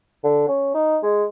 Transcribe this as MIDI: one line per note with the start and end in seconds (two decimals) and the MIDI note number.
0.24 0.44 50
0.48 0.73 61
0.74 0.97 63
1.03 1.24 56